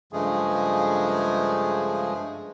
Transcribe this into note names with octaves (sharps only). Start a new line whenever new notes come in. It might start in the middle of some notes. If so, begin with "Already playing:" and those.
G2 C#3 F3 G#3 A3 G#4